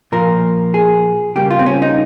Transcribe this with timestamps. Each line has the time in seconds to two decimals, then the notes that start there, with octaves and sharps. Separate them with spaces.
0.12 A#2 F3 A#3 A#4
0.74 G#4
1.36 C#3 G3 A#3 G4
1.51 F4
1.59 C4
1.66 C#4
1.82 D#4